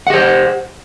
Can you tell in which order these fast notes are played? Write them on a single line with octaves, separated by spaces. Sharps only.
F#5 G4 C5